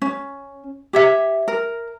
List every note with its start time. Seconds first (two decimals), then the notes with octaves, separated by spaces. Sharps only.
0.02 C#4
0.93 G4 C#5 E5
1.48 A#4